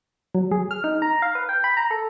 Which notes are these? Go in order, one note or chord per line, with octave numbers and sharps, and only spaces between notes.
F#3
G#4
F6
D#4
A#5
F5
B4
G5
B5
A#5
A4